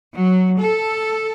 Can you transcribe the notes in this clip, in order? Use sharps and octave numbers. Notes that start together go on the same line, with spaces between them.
F#3
A4